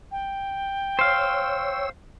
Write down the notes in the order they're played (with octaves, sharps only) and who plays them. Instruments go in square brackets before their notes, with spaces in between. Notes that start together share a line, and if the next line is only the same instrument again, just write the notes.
[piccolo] G5
[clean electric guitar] C5 F5 [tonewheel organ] C#5 E6